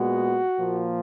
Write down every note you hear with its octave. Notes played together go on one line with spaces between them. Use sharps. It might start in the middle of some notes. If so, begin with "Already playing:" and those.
Already playing: A#2 G#3 B3 F#4
A#2 F3 A#3